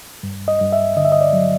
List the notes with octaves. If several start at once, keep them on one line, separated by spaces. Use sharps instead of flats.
G2
D#5
G2
E5
D3 D#5
E5
D#5
D5
F#3